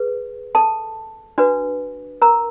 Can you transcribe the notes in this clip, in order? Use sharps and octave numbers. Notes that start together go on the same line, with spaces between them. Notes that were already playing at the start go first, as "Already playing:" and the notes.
Already playing: G#4 B4
A4 A5
D4 F#4 B4
A#4 A#5